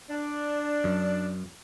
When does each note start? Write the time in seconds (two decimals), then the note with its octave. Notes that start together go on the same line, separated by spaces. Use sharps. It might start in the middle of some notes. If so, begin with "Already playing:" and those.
0.10 D4
0.84 F#2